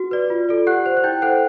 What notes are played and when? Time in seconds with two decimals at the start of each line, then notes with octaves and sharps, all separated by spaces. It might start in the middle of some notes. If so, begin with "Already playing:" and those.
Already playing: F#4
0.11 B4 D5
0.30 F4
0.49 A4 D5
0.67 G4 F#5 F#6
0.86 C5
0.97 F#6
1.04 E4 G5 G6
1.22 A4 C5 F#5 F#6